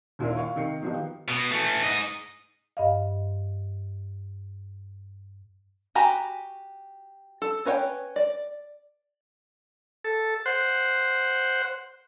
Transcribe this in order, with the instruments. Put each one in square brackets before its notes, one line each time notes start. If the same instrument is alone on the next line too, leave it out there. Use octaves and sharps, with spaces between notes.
[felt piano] D#2 A#2 D4 E4 A#4
F5 C#6
C3 D#3 A#4 C7 C#7
D#3 F3 A#3 B3 D#4 G4
[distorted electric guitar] B2
E3 A3
G#2 D#5
[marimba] G2 D#5 F5
[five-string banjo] F#4 G4 G#5 A#5 B5
A4
C#4 B4 C#5 F5 G5
D5
[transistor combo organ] A4
C5 F#5